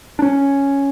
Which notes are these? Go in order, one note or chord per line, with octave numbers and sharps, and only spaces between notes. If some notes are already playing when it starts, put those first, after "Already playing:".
D4
C#4